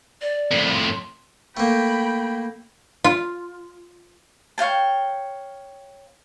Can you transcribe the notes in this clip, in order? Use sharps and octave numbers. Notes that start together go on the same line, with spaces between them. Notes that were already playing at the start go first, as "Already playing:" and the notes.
D5
F2 A2
C6
A3 A#3 G5 B5
F4
C#5 F5 G5 A5